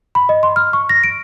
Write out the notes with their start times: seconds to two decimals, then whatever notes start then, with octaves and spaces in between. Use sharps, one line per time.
0.15 B5
0.29 D#5
0.43 C6
0.56 F6
0.73 C#6
0.89 A#6
1.04 D7